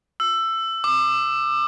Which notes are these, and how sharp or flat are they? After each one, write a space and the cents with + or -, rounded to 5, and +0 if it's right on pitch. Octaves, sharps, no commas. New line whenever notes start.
E6 +15
D6 +30